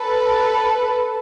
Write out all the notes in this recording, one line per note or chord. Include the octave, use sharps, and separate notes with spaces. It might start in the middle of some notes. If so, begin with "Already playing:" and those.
Already playing: A4 B4